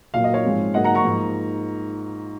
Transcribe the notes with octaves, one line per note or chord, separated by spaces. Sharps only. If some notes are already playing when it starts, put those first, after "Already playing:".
A#2 F#3 A#3 F5
D#5
C#5 F5
G#2 F3 G#3 C4
G#2 F#3 A#3 D#5 F#5
F#5 A#5
A#5 C#6
G#2 F3 A#3